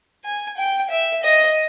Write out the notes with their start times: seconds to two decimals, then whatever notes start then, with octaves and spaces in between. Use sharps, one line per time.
0.25 G#5
0.57 G5
0.90 E5
1.23 D#5